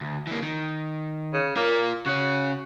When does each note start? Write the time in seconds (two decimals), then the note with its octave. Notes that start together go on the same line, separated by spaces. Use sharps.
0.01 D2
0.27 E3 A#3
0.43 D#3
1.34 C#3
1.56 A#3 F4 A#4
2.06 C#3 F#4 C#5